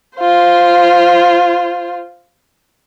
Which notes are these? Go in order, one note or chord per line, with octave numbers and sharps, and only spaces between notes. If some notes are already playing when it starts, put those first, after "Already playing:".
F4 C5